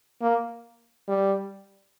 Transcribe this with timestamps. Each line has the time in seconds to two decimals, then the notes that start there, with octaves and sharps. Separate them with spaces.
0.21 A#3
1.08 G3